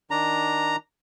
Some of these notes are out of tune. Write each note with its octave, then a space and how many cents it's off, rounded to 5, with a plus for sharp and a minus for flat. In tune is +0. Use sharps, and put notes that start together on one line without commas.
D#3 +0 D4 +0 A#5 +0